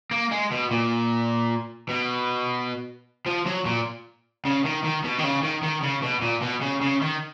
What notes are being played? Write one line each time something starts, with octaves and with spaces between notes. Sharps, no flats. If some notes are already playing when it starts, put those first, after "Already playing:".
A#3
G#3
B2
A#2
B2
F3
F#3
A#2
C#3
D#3
D#3
B2
D#3
C#3
D#3
D#3
C#3
B2
A#2
B2
C#3
C#3
D#3